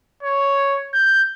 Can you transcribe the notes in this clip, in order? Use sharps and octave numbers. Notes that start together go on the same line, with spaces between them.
C#5
G6